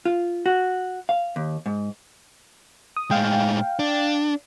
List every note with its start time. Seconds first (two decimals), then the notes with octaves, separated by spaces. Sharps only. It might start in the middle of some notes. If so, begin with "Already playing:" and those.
0.05 F4
0.46 F#4
1.09 F5
1.36 D#2
1.66 G#2
2.97 D#6
3.11 A2 G#3 F5 G5
3.79 D4